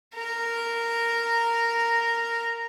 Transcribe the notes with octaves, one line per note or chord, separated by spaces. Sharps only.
A#4 A#5